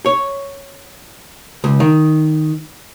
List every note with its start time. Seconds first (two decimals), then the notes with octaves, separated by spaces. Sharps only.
0.06 C#5
1.64 C#2
1.80 D#3